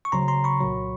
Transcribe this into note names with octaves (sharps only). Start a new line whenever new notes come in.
C#6
D2 C#3 F#3 A#5 C6
A#5 C6
B5 C#6
C2 A#2 F#3